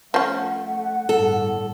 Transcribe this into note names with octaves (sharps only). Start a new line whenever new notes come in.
F3 A3 C#4 F#5
G1 A2 A4